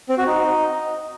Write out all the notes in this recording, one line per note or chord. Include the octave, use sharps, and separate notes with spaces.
C4
F#4
D#4